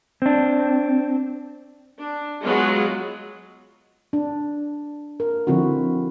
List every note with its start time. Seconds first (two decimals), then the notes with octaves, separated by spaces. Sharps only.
0.22 C4 D4
2.02 D4
2.43 F#3 G#3 B3 F4 F#4
4.13 D4
5.20 A#4
5.47 D3 F3 C4 E4 F#4